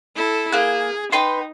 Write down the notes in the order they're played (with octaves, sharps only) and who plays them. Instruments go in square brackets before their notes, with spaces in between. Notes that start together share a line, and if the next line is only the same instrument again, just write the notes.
[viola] E4 A4
[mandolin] A#3 F#6 [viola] G#4
[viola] D#4 [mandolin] B4 G5 C6